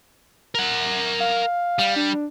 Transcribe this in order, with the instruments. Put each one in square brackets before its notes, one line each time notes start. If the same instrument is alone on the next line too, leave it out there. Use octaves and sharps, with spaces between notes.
[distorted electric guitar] A#4 F#5
[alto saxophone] F5
[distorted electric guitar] G3
[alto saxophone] D4